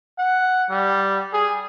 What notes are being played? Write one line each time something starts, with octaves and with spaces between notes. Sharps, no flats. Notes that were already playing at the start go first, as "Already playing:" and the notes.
F#5
G3
G#4